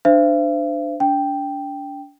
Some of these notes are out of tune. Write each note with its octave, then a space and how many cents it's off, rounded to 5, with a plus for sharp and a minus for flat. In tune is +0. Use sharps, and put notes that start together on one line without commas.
D4 +20 C5 -25 E5 +45
D4 -35 G5 +0